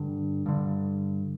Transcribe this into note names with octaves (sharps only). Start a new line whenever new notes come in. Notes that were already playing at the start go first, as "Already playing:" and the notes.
Already playing: G2 D3
G2 D3